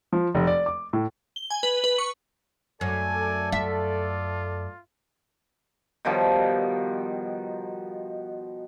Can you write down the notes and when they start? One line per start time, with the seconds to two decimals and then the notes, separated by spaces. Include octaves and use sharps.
0.13 F3
0.35 F1
0.47 D5
0.66 D6
0.93 A2
1.36 G7
1.50 G#5
1.63 B4
1.84 B4
1.98 C#6
2.81 F#2 A3 A4 D5 G#5
3.52 F#2 F4 E5
6.05 B2 D#3 F3 G3